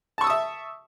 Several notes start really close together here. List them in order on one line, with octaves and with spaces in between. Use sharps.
A5 C#6 E6 D#6 E5